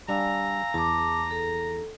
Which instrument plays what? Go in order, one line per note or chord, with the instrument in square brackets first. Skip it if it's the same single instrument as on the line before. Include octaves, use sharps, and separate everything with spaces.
[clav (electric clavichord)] G3 D4 [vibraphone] F5 G#5 E6 [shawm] A#5
[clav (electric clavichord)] E2 [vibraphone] A5 D6
[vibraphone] A4